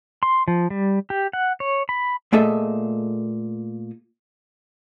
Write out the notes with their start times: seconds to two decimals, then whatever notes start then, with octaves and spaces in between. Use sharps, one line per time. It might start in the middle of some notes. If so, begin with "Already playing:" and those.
0.23 C6
0.48 F3
0.70 G3
1.10 G4
1.33 F#5
1.60 C#5
1.89 B5
2.33 A#2 A3 G#4 A4 D#5 E5